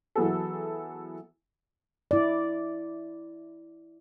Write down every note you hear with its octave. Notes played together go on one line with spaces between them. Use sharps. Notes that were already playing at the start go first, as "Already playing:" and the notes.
E3 F#3 B3 G#4 A4
E4 D5